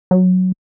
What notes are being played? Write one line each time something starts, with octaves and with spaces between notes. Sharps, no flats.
F#3